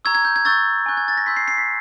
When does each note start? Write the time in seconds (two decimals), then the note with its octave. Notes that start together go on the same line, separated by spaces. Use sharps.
0.05 A#5 C#6 E6 G#6
0.15 G#6
0.25 G6
0.36 G#6
0.45 C#6 E6 G6 A6
0.86 G#5 C#6 F#6 G6
0.97 G#6
1.08 A6
1.17 A#6
1.26 C6 E6 G6 B6
1.37 C7
1.48 C7
1.58 B6